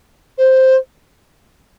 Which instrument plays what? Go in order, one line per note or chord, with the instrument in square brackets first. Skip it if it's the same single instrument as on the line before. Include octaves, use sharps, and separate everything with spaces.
[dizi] C5